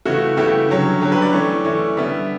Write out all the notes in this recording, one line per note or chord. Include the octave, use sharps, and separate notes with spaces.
C#3 E3 A3 F#4
C#3 E3 A3 G4
D3 F#3 C#4
D3 F#3 C#4 G4
B4
D5
E3 A3 C#4
E3 A3 C#4
D3 G3 B3 E5